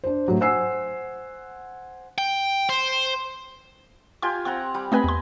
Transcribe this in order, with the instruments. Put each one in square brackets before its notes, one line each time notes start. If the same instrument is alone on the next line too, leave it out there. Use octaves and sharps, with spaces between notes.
[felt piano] D4 C5
A2 F#3
C5 F#5 G#5 E6 C7
[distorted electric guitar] G5
C5
[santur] F4 G4 G#5 [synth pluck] C6
[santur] C4 F#5 A#5 [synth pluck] C6
[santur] G3
[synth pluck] A3 C4 B4 [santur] D#5 G#5 B5
[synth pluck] E2 C6